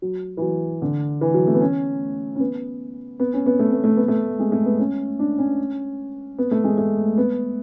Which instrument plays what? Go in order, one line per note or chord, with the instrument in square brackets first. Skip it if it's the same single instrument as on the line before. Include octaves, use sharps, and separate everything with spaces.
[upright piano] F#3
E3
F#3
D3
E3
F#3
A3
B3
C#4
C#4
B3
B3
C#4
B3
A3
B3
A3
B3
A3
G#3
A3
B3
C#4
D4
C#4
B3
A3
G#3
A3
B3